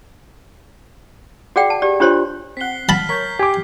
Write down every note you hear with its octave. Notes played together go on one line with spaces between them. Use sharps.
F#4 G#4 D5 F#5 G5
A5
G4 D5
D4 F4 G4 C5 C#5 C6
C4 F#5 B6 C7 G7
A5 B5 F6 B6
A#4 C#5 G6 B6
G4 G#5 D6